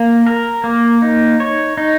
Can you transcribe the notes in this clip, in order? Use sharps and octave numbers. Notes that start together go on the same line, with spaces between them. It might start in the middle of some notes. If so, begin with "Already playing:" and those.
Already playing: A#3
A#4
A#3
D#4
C#5
D#4